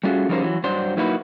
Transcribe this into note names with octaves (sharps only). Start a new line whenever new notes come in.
G3 A3 C#4 F4 F#4 G#4
F3 G3 C#4 D#4 A#4 C5
E3 F#3
G2 F#3 D4 C5
F#3 A#3 D#4 E4 F#4 B4